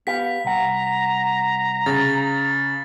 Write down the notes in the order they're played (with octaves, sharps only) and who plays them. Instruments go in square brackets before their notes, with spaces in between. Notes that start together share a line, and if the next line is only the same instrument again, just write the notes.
[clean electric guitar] B3 G4 F5 [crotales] B6
[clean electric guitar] C2 F#5 [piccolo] A#5
[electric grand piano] C#3 [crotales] A6